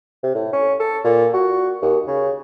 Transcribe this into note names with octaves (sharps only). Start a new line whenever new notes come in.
C3
A2
C#4
A4
A#2
F#4
D#2
C#3